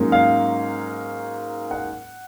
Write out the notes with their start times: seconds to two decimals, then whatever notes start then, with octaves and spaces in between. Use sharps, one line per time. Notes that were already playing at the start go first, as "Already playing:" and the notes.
Already playing: G#2 F#3 A#3 C#4
0.12 F5
1.71 F#5